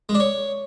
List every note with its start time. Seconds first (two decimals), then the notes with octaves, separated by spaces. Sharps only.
0.09 G#3
0.15 D4
0.20 C#5